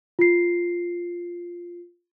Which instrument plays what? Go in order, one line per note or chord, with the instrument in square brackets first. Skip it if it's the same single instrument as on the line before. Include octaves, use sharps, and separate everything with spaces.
[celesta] F4 C7